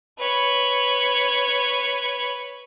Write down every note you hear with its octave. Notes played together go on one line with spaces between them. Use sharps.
B4 C#5